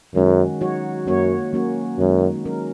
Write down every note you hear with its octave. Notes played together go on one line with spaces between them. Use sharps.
F#2 D#3 G#3 C#4 F#4
F#3 D#4 F#4 C#5
F#2 A#3 F#4 C#5
F#3 A#3 C#4 F#4
F#2 D#3 G#3 D#4
F#3 C#4 A#4